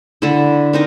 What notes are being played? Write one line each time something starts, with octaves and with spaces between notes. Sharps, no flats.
D3 E4
C4 D#4 A#4